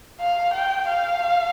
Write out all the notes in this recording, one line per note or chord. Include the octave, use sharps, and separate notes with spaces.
F5
G5
F5